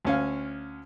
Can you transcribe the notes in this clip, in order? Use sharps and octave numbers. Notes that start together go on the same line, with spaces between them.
D2 C#4 F5